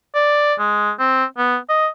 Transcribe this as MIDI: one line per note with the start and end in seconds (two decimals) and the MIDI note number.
0.15 0.54 74
0.59 0.91 56
1.00 1.24 60
1.38 1.57 59
1.69 1.87 75